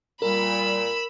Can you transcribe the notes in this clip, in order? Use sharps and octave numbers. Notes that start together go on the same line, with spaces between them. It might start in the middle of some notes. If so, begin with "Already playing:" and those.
A#2 G3 A#4 B5 E6